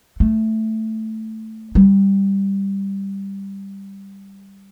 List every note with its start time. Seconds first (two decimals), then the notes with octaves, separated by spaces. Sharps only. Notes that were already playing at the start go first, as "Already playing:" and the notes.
0.20 A3
1.75 G3